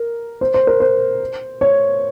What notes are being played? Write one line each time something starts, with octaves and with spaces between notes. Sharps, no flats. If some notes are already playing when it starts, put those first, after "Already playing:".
Already playing: A#4
C5
C5
A#4
C5
C#5